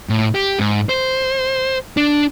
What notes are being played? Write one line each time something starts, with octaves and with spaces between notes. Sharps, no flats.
A2
G4
G#2
C5
D4